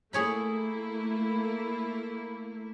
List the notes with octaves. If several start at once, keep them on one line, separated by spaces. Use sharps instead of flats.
A3 A#3 E4 G#4 C#5 B5